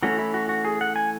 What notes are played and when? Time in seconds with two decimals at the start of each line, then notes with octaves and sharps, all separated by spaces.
0.03 E3 A3 C#4 F#4
0.19 E4
0.34 F#4
0.49 F#4
0.65 G#4
0.81 F#5
0.96 G#5